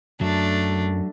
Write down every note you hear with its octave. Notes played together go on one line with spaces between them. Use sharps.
F#2 F#3 A3 D4